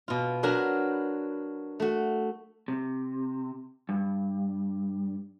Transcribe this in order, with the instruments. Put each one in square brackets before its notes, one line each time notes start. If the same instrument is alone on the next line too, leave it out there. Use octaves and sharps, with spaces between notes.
[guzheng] B2 F4
F#3 D4 F#4 A#4 B4
A3 F#4
[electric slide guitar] C3
G2